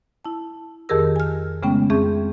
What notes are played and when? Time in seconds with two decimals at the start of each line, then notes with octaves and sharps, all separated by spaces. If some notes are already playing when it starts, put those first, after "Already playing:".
0.25 E4 A5
0.89 F2 D#3 G4 G#4 A#4 E6
1.16 G#5 F6
1.63 C#3 G#3 A3 B3 C#4 G5
1.90 F2 C4 G#4 E5 C#6 G6